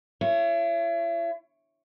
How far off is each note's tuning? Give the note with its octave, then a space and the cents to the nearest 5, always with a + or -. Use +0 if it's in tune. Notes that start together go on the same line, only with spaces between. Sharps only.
E4 +40 C#5 +0